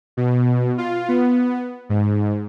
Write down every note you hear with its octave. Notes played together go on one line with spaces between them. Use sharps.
B2
F4
B3
G#2